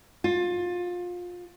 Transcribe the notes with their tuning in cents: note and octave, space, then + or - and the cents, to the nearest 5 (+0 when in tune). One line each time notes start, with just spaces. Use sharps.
F4 +25